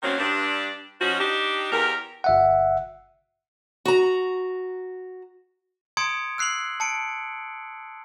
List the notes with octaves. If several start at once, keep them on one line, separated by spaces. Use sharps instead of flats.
D#3 F#3 A#3 C4 C#4
G2 D4
F3 C#4 D#4 F#4
D4 D#4 G4
E2 G4 A#4
G1 E5 F#5
F#4 A#5
A#5 C6 D#6 G#6 C#7 D7
E6 F#6 C7 F7 F#7
A5 C#7 D7